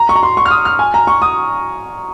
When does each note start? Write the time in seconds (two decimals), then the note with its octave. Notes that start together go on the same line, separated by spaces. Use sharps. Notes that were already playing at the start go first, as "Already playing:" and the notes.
Already playing: A#5
0.09 C#6
0.16 A#5
0.23 C6
0.37 C#6
0.46 F6
0.51 D#6
0.65 F6
0.79 G#5
0.94 A#5
1.07 C#6
1.22 D#6